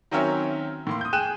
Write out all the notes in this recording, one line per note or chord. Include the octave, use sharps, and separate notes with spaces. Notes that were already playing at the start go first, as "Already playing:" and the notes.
D#3 F#3 C4 C#4 A#4 E5
A2 A#3 C6
D#6 G6
G#4 G5 F#6 D#7 E7